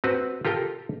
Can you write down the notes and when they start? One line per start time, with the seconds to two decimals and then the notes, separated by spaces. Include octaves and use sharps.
0.04 C4 F#4 B4
0.45 F4 G4 A4 A#4 G5